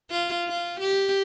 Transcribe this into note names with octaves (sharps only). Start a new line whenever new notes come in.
F4
F4
G4